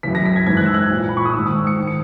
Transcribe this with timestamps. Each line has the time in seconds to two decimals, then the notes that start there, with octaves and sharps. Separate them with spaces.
0.03 F#2 C#3 E3 B6
0.15 A#6
0.26 B6
0.36 G#6
0.47 G#2 E3 G#6
0.57 F#6
0.66 E6
0.74 F#6
0.91 A#2
1.09 B5
1.17 C#6
1.25 D#6
1.34 G#2 D#3 E6
1.46 D#6
1.56 E6
1.67 C#7
1.77 D#3
1.87 C#7